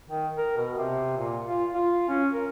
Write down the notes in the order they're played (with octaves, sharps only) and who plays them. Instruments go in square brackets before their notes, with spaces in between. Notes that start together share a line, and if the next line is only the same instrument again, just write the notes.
[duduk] D#3
A#4
B2
C3
A#2
F4
F4
C#4
A#4